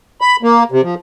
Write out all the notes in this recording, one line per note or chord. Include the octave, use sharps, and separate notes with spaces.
B5
A#3
C3
F3